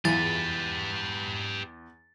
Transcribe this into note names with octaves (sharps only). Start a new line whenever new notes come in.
E2 E4 F4 G4 G#4 B4 A6